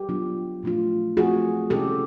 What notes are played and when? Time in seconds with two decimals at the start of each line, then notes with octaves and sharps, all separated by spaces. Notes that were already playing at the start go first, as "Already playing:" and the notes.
Already playing: G4
0.09 F#3 B3 D4 F4
0.63 A#2 F3 A3 D4 F4
1.17 F3 A3 C4 F4 F#4 G#4
1.70 C3 D#3 G#3 C#4 E4 G4 A4